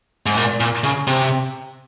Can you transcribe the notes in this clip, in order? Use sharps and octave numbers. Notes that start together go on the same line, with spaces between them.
G#2
A#2
A#2
C#3
C3